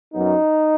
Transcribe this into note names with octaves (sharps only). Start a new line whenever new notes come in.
F#2 F#3 B3 D#4